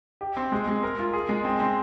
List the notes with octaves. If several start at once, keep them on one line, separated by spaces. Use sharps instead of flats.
G4
C4
G#3
G#3
A#4
F4
G#4
G#3
C4
C4